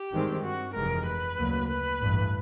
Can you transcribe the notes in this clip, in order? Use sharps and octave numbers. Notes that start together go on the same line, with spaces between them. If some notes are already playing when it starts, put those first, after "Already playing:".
Already playing: G4
G2 D#3 G#3 C4
F#4
F1 F2 C3 E3 G#3 A#4
B4
D2 C#3 F#3 A#3
B4
A1 G2 E3